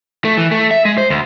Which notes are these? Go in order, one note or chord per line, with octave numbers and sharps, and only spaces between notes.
A3
E3
A3
E5
G#3
C5
D2